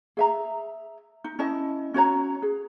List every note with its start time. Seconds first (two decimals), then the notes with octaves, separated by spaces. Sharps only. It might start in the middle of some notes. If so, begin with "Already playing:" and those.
0.17 G#4 E5 A#5
1.24 D#4
1.39 C#4 E4 D#5 A5
1.94 C#4 F#4 C#5 A#5
2.42 G#4